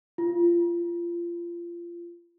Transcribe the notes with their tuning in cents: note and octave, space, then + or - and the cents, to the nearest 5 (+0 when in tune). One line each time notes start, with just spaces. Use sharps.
F4 -25